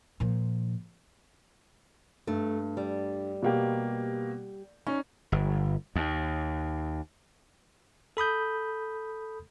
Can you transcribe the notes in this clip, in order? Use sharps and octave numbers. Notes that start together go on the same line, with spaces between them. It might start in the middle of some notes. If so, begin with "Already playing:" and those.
A#2 F3
G2 A3
G3
B2 A#3 G4
C#4 D#4
G1
D#2
A4 B5 D#6 G6